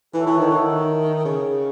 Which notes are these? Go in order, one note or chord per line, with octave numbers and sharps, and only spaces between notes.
E3 F#4 A4 C#5 E5
E3
D#3
D#3
C#3